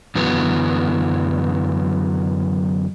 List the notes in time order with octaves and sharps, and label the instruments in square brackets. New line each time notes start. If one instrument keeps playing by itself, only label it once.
[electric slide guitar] F#2 D3 E3 F#3 B3